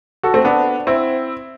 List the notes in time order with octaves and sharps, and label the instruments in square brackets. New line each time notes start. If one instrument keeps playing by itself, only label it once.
[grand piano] F#4 A4
A3 C4
B3 D4
C4 E4